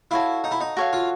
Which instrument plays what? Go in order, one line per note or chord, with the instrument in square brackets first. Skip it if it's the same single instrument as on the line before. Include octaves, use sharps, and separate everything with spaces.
[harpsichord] E4 [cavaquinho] F#4 A4 C#5 F5
[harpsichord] D#4
E4
D#4
[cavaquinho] F#4 A4 C#5 F5
[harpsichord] F4